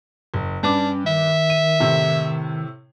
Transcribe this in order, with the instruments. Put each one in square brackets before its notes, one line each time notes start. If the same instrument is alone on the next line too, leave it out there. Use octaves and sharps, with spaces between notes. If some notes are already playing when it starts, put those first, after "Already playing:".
[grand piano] F#1
[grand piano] G2 B4 D6 [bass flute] C#4 [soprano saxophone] D4
[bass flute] D#3 [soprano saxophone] E5
[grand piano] D#7
A2 C3